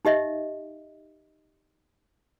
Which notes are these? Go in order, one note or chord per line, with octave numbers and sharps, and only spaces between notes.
D#4 G4 D#5 E5